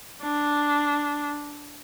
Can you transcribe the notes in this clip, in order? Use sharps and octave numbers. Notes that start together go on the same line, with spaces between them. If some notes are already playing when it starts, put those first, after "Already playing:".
D4